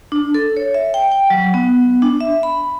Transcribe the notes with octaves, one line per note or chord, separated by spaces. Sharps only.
D4
A4
C#5
E5
G5
G5
F#3
B3
D4
E5
B5